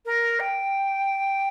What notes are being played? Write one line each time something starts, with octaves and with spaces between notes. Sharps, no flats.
A#4
G5